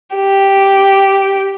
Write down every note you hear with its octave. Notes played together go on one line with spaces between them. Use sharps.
G4